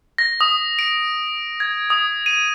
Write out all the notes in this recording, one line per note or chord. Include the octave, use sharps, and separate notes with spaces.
A#6
D#6
D7
G#6
D#6
D#7